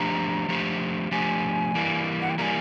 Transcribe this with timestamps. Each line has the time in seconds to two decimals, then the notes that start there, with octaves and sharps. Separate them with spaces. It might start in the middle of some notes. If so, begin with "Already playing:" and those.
Already playing: F3 A3 D4 G4 C5 A#5
0.48 F3 A3 D4 G4 C5
1.11 F3 A3 D4 G4 C5 G#5
1.75 E3 G3 A#3
2.22 F#5
2.30 G5
2.38 E3 G3 A#3 G#5 A#5